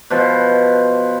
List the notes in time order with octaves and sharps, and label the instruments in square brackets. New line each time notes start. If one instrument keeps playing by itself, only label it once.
[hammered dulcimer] B2 F3